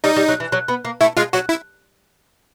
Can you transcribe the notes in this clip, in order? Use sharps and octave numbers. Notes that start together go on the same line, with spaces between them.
G3 D#4
G3
F#3
E3
F#3
B3
A#3
A3 E4
G#3 F4
F#3 F#4
E4